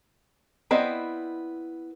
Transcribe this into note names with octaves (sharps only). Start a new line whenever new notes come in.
B3 C4 E4 D5 D#5